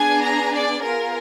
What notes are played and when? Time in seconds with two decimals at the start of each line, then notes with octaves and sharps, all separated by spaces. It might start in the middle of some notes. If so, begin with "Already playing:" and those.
Already playing: B3 D4 G#4 G#5
0.24 A#5
0.54 D5
0.83 B3 F4 G#4 A#4